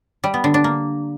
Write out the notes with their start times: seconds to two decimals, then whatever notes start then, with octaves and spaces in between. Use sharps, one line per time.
0.24 G3
0.34 B3
0.44 D3
0.54 D4
0.64 A#3